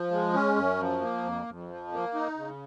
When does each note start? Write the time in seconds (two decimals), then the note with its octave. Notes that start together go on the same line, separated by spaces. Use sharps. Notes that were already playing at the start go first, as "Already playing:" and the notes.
Already playing: F3
0.11 G#3
0.33 C#4
0.56 F#2
0.79 F3
1.01 A#3
1.23 F2
1.47 F2
1.69 F3
1.92 A#3
2.14 D#4
2.37 C#3